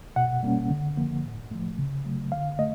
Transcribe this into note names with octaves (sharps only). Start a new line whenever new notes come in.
B2 F#5
G3 A#3 C#4
D3
F3 A#3
A2
F3 A3
C#3
F#3 A3
D3 F5
A3 D#5